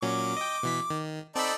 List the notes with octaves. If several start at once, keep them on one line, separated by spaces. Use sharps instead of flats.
A#2 F#3 C#4 D6
D#5 G5
B2 E3 B6
D#3
C4 D#4 A4 D5 B5